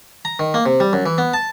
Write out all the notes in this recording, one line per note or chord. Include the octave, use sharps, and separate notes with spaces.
A#5
D#3
A#3
C3
G3
F#2
E3
B3
A5